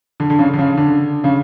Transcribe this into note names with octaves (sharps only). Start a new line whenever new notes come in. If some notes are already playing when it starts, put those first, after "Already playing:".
D3
D3
C#3
D3
C#3
D3
C#3